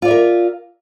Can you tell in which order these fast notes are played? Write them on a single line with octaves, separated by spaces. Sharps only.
F4 D5 E5 A#4